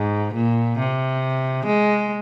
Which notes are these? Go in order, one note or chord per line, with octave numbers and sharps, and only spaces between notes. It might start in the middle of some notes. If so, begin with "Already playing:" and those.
Already playing: G#2
A#2
C3
G#3